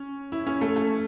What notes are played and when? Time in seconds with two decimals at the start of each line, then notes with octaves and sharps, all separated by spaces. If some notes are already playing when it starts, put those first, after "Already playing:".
Already playing: C#4
0.32 E4
0.47 C#4
0.61 A3
0.76 A3